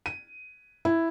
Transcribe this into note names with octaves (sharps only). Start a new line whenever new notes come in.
D#7
E4